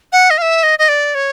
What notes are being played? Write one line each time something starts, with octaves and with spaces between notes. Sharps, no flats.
F#5
D#5
F5
E5
D#5
D#5
D5
C#5